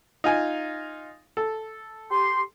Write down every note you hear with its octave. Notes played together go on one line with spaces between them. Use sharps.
D#4 F4 G#5
A4
G4 C6